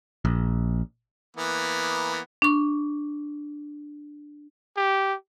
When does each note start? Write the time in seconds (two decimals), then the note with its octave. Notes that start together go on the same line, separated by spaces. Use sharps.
0.25 A#1
1.37 E3 A#3 B3
2.42 D4 C#6
4.77 G4